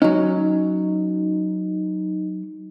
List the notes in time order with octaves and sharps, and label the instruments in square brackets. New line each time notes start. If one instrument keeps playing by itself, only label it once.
[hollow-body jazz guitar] F#3 C#4 [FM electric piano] D#4